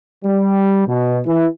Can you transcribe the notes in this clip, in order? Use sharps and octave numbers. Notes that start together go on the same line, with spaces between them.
G3
B2
E3